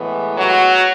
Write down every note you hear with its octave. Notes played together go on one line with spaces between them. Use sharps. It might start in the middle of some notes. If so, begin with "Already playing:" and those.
Already playing: A2 E3 G#3 B3
F#3 F#4